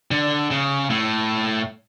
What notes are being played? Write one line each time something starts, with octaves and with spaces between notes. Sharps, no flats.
D3
C#3
A2